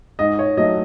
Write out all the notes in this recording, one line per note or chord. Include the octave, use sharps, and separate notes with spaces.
G#2 D#5
C#5
F#3 A3 D#5